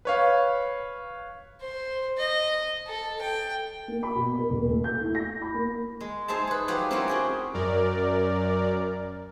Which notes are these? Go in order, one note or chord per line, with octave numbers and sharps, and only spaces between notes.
B4 C#5 F5
C5
D#5
A4
G5
A#3
B5
B2
A#4
D#1
A3
G6
E4
A#6
B5
A#3
G#3
D#4 G#4 C5 E5 A5
B4 C#5
F#3 F4 G4 C5
C4 C#4 E4 G4 A#4 C#5
F#4 G#4 G5
F#2 A#4 D5